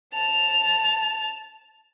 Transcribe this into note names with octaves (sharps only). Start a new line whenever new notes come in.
A5 F7